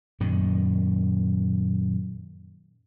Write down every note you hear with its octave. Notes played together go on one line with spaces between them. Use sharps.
F#2 A#2 D#3